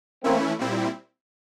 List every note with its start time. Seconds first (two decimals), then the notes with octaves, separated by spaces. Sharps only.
0.24 E3 A3 A#3 C4 C#4 E4
0.59 A#2 G3 C4 E4